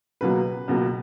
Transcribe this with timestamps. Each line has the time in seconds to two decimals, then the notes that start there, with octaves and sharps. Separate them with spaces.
0.21 C#2 B2 F#3 A#3 B4
0.68 C#2 B2 F#3 A#3